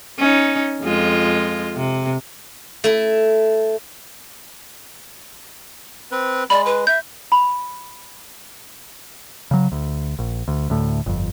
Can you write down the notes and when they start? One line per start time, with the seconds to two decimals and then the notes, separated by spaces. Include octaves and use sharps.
0.19 C#4 D#4
0.83 F2 G#3 F4
1.75 C3
2.84 A3 E4
6.11 C4 B4
6.50 G#3 D5 B5
6.66 B4
6.87 E5 G6
7.32 B5
9.51 C#3 F#3
9.72 D2
10.19 A#1
10.48 D2
10.70 D2 A2
11.06 G1 F2